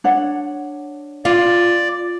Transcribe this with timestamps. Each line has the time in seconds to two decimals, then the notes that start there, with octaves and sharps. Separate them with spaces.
0.04 D4 C#5 F#5
1.25 F4 D5